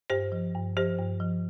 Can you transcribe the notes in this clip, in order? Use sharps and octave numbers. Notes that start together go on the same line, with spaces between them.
G2 G4 C5
F3
G2
F3 G4 C5
G2
F3